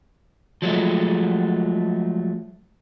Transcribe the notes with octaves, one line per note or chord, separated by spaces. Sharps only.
F3 F#3 G#3 A3